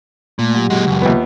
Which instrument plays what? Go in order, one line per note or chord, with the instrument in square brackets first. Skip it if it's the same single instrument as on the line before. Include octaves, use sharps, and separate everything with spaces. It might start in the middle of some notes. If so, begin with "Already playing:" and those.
[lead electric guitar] A#2 [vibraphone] A3
[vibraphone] F#3 G4
[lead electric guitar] A#2 G#3 [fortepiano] F#4
[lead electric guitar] C#2 F#2
[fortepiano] D#2 B3 [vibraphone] F4 E5